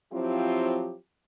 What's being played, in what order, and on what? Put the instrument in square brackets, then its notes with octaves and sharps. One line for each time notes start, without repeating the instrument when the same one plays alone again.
[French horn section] F3 F#3 C4 E4 F4 G4